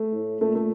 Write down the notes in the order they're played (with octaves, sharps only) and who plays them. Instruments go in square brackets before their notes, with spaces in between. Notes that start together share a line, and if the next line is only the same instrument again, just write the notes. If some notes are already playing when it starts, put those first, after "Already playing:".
Already playing: [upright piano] A3
[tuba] A2
[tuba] A#2 [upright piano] A3
[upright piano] A3